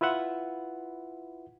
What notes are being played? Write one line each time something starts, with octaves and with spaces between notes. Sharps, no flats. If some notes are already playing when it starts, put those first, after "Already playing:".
E4 F4 B4 E5 F#5